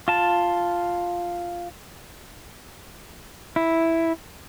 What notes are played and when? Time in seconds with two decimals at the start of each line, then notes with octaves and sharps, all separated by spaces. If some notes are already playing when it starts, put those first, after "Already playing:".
0.08 F4 A5
3.56 E4